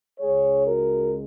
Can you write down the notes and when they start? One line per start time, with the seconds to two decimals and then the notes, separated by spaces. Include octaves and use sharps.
0.20 C#2 C#3 G#3 G#4 C#5
0.65 F#4 A#4